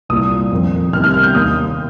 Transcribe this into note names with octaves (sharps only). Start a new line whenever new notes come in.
C2 A#2 D#6
F2 D#3
C2 C3 D#3 F6
F6
F6
G6
D#2 D#3 D#6